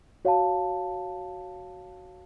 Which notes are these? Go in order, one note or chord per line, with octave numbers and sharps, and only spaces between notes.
F#4 C#5 F5 A5